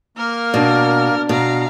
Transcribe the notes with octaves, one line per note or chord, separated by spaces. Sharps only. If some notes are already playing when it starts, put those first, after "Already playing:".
A#3 A#4 F6
B2 D4 D5
B2 F5 A#5